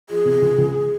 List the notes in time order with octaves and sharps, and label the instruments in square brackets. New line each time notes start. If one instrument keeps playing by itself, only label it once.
[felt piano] F3 [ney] G#4
[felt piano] C3
C#2
C#2